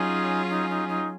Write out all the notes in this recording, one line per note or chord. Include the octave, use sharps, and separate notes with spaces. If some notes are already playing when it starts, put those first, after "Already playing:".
Already playing: F#3 C#4 D#4 F4 G#4
D#4
D#4
D#4